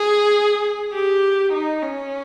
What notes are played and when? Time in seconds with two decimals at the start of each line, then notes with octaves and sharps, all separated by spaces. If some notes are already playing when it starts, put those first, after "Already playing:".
Already playing: G#4
0.93 G4
1.53 D#4
1.82 C#4